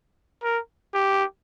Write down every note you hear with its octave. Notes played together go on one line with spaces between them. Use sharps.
A#4
G4